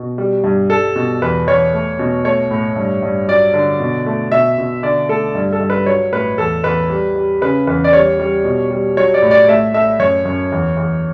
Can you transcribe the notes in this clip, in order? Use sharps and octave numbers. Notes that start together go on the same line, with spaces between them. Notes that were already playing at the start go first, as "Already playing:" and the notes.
Already playing: B2
G3
G2
G3 A4
B2
E2 B4
E2 C#5
A3
B2
A3 C#5
A2
G2
G2
F#3 D5
D3
B2
A3
B2 E5
B2
D3 D5
A3 A4
G2
A4
G2
B4
F#3 C#5
A2 B4
E2 A4
E2 B4
G3
G3
C#3 B4
E2 B4
D5
G3 C#5
G3
B2
G3
F#3 C#5
D5
A2
D5
A3 E5
A3 E5
F#2 C#5
F#2
E2
E2